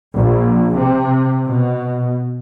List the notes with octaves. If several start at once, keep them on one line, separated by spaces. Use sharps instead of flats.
A#1
C3
B2